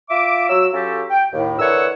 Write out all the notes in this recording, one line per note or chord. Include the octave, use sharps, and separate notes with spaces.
F4 E5 D6
F#3 E6
F#3 C#4 F4 G4 A4
G5
D#2 A2
D3 E3 A#4 C#5 F#5 E6